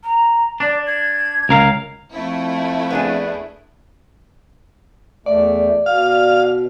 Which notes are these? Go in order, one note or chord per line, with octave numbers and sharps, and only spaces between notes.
A#5
D4 D5
G#6
C#2 A#4 F5
F2 A3 E4
B3 D4 G#4
E2 A3 D5
B2 F5